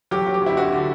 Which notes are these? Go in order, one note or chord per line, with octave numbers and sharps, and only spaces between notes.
F#3 G4
F#3
G4
D2 E4
D2 F#4
D3